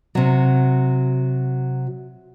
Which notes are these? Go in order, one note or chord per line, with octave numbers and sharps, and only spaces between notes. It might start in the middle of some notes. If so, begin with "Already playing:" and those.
C3 F#3